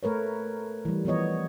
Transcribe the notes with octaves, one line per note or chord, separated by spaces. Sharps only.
A3 A#4 B4 C#5
E3 G3
E3 F3 B3 C#5 D#5